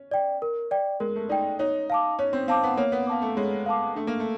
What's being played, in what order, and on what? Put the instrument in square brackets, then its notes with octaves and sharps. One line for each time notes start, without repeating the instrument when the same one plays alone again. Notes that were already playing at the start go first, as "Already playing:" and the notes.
Already playing: [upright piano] C#4
[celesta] D5 G5
A#4
D5 G5
[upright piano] G#3 [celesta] A#4
[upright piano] A3
[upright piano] D#4 [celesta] D5 G5
[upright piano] D#4 [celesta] C#5
[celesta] F5 A5 D6
[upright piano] C#4 [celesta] C#5
[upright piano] C4
[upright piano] C4 [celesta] F5 A5 D6
[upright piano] B3
[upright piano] A#3 [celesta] C#5
[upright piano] B3
[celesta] F5 A5 D6
[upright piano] A3
[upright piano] G#3 [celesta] C#5
[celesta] F5 A5 D6
[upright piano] A3 [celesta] D4
[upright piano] A#3
A3